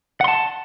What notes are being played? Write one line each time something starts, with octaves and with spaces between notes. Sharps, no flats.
F#5 A5 C6